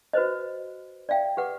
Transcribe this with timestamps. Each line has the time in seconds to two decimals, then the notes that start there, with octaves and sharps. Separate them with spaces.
0.13 F#4 B4 C5 D#5
1.09 D5 E5 F5 G5
1.37 G4 B4 F#5 D6